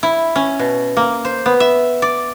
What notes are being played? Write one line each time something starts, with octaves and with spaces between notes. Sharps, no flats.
E4
C#4
B2
A#3
C5
B3
E5
D5